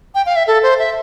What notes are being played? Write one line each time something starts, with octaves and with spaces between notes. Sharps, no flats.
G5
F5
E5
A4
C5
E5